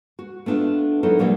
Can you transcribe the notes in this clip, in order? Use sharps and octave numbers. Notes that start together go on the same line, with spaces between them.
F#4
A3 B3 D4 D#4 F4
F#3 D#4 E4 A4 A#4
A#2 F#3 G3 F5